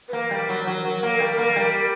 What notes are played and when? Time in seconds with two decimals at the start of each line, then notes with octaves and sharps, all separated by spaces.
0.08 B4
0.13 A#3 A#4
0.31 G3
0.49 F#3
0.67 F#3
0.85 F#3
1.03 A#3
1.20 G3
1.38 A#3
1.56 G3